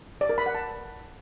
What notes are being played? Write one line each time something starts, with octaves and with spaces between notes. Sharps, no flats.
D5
A#4
B5
F#5
A5